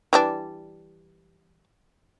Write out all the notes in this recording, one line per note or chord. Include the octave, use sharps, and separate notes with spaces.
E3 G3 D4